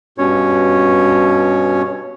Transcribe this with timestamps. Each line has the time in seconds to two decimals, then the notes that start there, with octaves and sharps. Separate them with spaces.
0.18 G2 B2 C#4 C#5